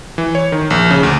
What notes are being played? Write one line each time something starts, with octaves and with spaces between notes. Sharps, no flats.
E3
C#5
D#3
A#1
C#3
D2